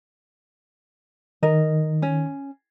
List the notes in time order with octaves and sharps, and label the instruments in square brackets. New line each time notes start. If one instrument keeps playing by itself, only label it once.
[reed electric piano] D#3 [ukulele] A#4 D#5
[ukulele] C#4